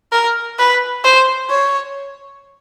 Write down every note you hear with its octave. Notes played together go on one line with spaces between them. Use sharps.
A#4
B4
C5
C#5